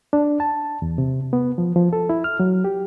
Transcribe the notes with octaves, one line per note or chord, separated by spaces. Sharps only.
D4
A5
E2
C3
B3
F3
F3
A4
E4
F6
F#3
G4